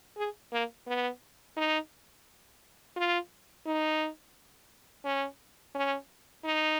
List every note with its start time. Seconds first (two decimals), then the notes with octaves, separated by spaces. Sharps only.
0.17 G#4
0.53 A#3
0.87 B3
1.57 D#4
2.96 F4
3.66 D#4
5.05 C#4
5.75 C#4
6.44 D#4